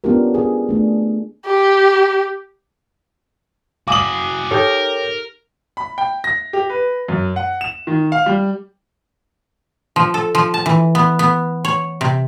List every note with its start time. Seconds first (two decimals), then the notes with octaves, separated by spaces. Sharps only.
0.04 B3 C#4 D4 F4 G4 A#4
0.34 G#4
0.69 A3 D4
1.46 G4
3.88 F#4 G#4 F5 G#5 D6 D#6 F#7
4.51 D#4 G4 A4 A#4 C#5 G5 G6
5.77 B5
5.98 G5
6.24 A#6
6.53 G4
6.70 B4
7.08 F#2
7.36 F#5
7.61 E7
7.87 D#3
8.12 F5
8.26 G3
9.96 F3
10.14 A4
10.35 F3
10.54 A5
10.66 E3
10.95 B3
11.19 B3
11.65 C#5
12.01 C3